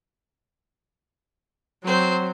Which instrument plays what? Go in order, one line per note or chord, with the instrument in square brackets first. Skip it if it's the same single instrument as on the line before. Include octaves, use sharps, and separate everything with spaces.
[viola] F#3 [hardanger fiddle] C4 C5